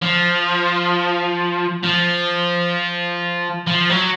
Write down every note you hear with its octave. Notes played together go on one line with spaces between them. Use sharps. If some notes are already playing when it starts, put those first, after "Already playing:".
F3
F3
F3
F#3